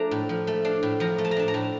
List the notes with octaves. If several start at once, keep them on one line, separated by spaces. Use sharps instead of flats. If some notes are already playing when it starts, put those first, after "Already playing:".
Already playing: F3 A3 D4 A#5
A2
F3
A3
D4 F5
A2
F3 A#5
A3
A5
A#5
D4 A5
A#5
A2